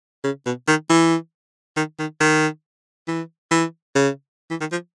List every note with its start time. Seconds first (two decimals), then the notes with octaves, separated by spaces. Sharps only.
0.24 C#3
0.46 B2
0.68 D#3
0.89 E3
1.77 D#3
1.99 D#3
2.21 D#3
3.08 E3
3.51 E3
3.95 C#3
4.51 E3
4.61 D#3
4.72 F3